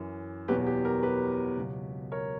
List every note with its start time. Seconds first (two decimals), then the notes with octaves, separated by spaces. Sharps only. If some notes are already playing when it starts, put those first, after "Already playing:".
Already playing: F#2 E3
0.48 E2 B2 F#3 G4 B4
0.67 G4
0.85 A#4
1.03 G4 B4
1.57 C#2 B2 F#3
2.12 A#4 C#5